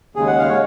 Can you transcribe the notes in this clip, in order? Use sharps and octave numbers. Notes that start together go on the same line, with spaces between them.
D#2 C#3 G#3 G#4
F#5
F5
G#3 C#5